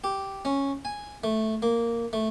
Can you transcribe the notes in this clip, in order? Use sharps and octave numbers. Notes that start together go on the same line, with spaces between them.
G4
C#4
G#5
A3
A#3
A3